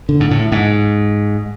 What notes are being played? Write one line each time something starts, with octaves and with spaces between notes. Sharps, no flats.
D3
G#2
A2
G#2